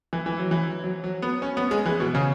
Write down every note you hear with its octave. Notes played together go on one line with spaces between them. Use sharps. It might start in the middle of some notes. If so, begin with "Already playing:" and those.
E3
E3
F#3
E3
F#3
F#3
B3
C#4
B3
G#3
E3
B2
C#3